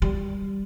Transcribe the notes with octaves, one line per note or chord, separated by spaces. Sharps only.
G3